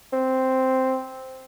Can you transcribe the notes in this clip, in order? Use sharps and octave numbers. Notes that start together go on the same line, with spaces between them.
C4